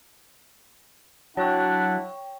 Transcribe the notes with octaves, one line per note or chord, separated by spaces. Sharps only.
F#3 D4 E4 C#5 F#5 G5 C#6